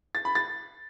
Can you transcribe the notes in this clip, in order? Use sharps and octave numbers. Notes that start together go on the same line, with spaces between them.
A6
B5
A6